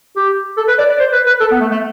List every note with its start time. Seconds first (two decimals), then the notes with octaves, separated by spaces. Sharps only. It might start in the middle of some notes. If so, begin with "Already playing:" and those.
0.16 G4
0.57 A4
0.68 B4
0.79 D5
0.89 D5
0.99 C5
1.12 B4
1.26 B4
1.40 A4
1.51 B3
1.61 A3
1.71 A3